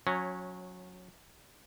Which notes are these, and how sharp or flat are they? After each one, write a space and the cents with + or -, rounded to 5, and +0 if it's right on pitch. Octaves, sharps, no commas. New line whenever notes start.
F#3 -25 C#4 +0